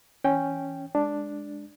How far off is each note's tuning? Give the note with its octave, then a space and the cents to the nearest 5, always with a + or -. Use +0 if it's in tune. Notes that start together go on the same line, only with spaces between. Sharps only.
E3 +0 C#4 +0 G5 +0
G#3 -5 D4 +0